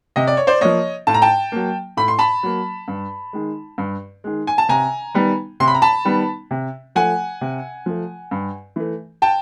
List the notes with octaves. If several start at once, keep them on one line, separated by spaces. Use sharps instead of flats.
C3 D#5
D5
C#5
C5 D5
F3 A#3 C#5 D#5
A2 A5
A#5
G5 A5
F#3 A#3
A2 B5
C6
A5 B5
F#3 A#3
G2
D#3 G#3
G2
D#3 G#3
G#5
A5
C3 G#5 A#5
D#3 G3 B3
C3 C6
B5
A#5
A5 B5
D#3 G3 B3
C3
F3 A3 F#5 G#5
C3
F3 A3
G2
E3 A3
G5 A5